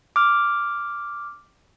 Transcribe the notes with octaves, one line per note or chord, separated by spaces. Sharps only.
D6 F6